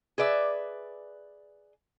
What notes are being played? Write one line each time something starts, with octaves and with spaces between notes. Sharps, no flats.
G#4 B4 D5 E5